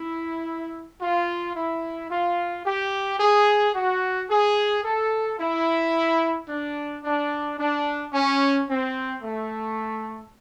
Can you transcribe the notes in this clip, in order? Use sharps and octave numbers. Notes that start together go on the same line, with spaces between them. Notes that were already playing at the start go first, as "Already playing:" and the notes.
Already playing: E4
F4
E4
F4
G4
G#4
F#4
G#4
A4
E4
D4
D4
D4
C#4
C4
A3